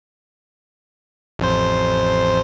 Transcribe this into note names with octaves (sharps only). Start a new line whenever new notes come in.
A1 F2 C5